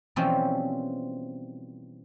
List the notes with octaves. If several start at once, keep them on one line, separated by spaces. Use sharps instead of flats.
B2 E3 F3 G3 C4 C#4